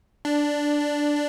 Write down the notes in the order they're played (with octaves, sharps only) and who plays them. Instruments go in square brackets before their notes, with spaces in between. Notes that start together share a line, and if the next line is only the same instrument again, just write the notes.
[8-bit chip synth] D4